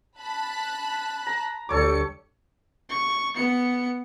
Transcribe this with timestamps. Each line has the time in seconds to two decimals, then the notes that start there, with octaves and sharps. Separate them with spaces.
0.19 A5 B5 F#6
1.27 A#5
1.69 D2 G3 A4 C#5 D6 C#7
2.89 C#6
3.36 B3 C#7